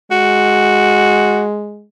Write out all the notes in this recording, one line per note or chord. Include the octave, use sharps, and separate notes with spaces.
G#3 F#4